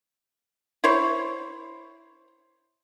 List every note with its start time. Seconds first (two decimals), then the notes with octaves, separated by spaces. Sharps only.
0.84 E4 C5 C#5